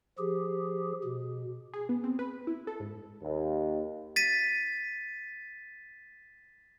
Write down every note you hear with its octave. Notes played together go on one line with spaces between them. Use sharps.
F3 G4 G#4
B2
G#4
B3
C4
B4
E4
A4
G#2
D#2
A6 B6 D#7